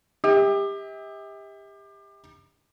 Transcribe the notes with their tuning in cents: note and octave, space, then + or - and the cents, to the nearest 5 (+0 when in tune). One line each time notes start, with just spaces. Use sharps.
G4 +25 E5 -45